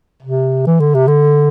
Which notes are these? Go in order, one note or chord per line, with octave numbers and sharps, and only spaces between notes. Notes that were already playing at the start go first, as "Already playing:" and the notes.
C3
E3
D3
C3
D3